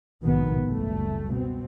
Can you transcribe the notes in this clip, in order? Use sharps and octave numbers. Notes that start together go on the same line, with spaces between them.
A#1 G#2 B2 D#3 B3
F#1 C#2 G3 A3
B2 C4